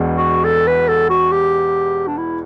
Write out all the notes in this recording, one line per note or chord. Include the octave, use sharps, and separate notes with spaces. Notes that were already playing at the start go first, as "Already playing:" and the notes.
Already playing: E1 E2 B2
F#4
A4
B4
A4
F#4
G4
D4
E4